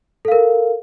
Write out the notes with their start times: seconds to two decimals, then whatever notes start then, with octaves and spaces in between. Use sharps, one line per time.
0.25 A4
0.28 F5
0.32 A#4